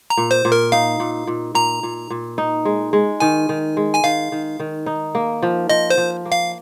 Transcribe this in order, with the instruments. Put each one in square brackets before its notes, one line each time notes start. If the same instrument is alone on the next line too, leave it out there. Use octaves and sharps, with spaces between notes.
[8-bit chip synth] A#5
[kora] A#2
[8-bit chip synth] C5
[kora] A#2
[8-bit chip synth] A#4
[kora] D#4 [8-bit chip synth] F5
[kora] A#2
A#2
[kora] A#2 [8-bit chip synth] A#5
[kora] A#2
A#2
D#4
G#3
G#3
[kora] D#3 [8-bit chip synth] G#5
[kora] D#3
G#3
[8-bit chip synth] G#5
[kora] D#3 [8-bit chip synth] F5
[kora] D#3
D#3
D#4
A#3
F3
[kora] F3 [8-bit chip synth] D#5
[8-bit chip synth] C5
[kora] F3
A#3
[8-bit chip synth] F5